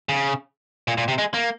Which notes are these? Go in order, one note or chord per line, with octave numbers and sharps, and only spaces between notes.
C#3
A#2
A#2
C3
G#3
A#3